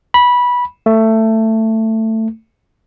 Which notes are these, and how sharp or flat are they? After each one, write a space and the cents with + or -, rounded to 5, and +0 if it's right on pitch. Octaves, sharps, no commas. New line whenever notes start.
B5 -15
A3 +15